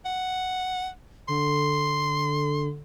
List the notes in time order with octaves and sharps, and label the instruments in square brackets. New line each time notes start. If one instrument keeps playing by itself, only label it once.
[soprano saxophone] F#5
[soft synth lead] D3 [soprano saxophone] C6